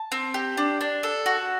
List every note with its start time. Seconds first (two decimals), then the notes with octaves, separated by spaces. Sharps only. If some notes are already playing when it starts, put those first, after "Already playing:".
Already playing: A5
0.12 C4
0.34 G4
0.57 D4
0.81 D4
1.03 A4
1.26 F#4